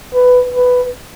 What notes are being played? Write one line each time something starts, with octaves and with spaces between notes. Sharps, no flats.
B4
B4